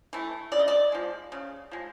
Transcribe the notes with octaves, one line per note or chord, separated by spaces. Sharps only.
E3 A3
C#3 D5
D#5
D5
F3 G#3
C#3
F3 G#3